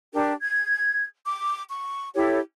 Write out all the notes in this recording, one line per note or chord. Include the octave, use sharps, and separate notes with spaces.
D4 G4 A#4
G#6
D6
C#6
E4 G4 A4 C#5